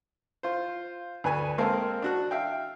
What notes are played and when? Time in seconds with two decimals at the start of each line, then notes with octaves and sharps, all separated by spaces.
0.43 F4 C5
1.24 D2 B4 G#5
1.58 G#3 A#3 C4 A4 A#4 F5
2.02 D4 F#4 F#6
2.31 E5 F5 G5